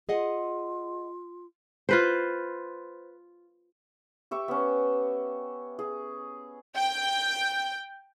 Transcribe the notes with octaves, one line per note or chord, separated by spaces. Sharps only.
F4 G#4 D#5 F#5
F4 B4 C5
G4 E5 C#6
B3 C#4
G#4
G5